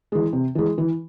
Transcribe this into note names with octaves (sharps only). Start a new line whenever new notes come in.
E3 G#3
C3
E3 G#3
E3